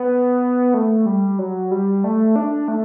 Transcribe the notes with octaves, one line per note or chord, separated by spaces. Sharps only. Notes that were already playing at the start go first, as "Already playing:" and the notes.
Already playing: B3
A3
G3
F#3
G3
A3
D4
A3